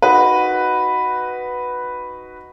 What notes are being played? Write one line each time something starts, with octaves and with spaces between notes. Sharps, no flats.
D#4 F#4 B4